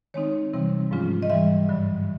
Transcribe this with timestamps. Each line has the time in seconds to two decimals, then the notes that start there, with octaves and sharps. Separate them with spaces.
0.14 D#3 G#3 C4 D#4 C#5
0.54 C3 E3 G3 C4
0.91 G#2 F3 G#3 C#4 F4
1.23 D#5
1.30 G#2 E3 G3 E5
1.69 G2 D3 F#3